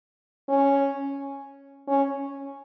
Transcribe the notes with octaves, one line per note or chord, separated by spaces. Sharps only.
C#4
C#4